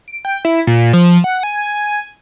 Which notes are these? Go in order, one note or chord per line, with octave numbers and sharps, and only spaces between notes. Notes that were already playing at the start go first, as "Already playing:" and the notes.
D7
G5
E4
A#2
F3
F#5
G#5